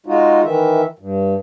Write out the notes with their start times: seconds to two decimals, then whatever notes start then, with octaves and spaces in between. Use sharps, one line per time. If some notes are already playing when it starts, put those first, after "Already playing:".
0.06 G#3 D#4 F4 F#4
0.43 D#3 E3 E5
0.99 G2